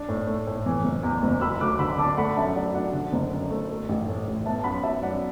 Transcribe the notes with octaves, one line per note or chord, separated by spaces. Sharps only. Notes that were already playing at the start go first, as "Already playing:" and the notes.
Already playing: D4
A2
A3
A2
E3
F#1
E2
F#1
F#3 B5 E6
D2 D6 F#6
D3 B5 E6
D4 A5 D6
A3 F#5 B5
B5
F#2 E5 A5
F#3 D5 F#5
D4 D5 F#5
D3
F#1
F#2
A3
A3
A1
A2
A1
B3 E5 A5
A5
F#2 F#5 B5
F#3 E5 A5
F#2 D5 F#5